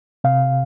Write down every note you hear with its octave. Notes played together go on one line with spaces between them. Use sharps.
C3 F5